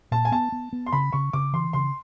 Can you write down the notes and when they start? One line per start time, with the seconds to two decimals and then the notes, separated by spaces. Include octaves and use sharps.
0.11 A#2 A5
0.25 G#5
0.32 B3 A5
0.52 B3
0.73 B3
0.86 C6
0.92 C#3 B5
1.13 C#3 C#6
1.33 C#3 D6
1.53 E3 C6
1.73 C#3 C6